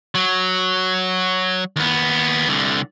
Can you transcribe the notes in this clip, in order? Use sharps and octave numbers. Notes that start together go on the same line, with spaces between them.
F#3
D#2 B3
C2 D3